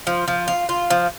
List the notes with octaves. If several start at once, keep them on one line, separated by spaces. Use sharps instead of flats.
F3
F3
F4
F4
F3